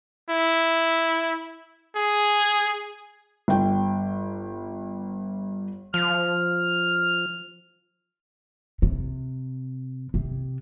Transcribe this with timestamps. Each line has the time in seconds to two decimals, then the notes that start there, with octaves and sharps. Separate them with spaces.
0.30 E4
1.96 G#4
3.48 G1 G5
5.94 F3 F6
8.82 C3
10.14 C3